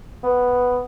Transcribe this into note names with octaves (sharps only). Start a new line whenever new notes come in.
B3